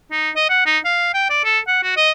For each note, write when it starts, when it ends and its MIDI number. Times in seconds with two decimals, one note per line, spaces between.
0.12 0.30 63
0.36 0.47 75
0.50 0.61 78
0.66 0.78 63
0.85 1.11 77
1.14 1.29 79
1.30 1.43 74
1.44 1.59 69
1.67 1.83 78
1.83 1.94 66
1.97 2.11 75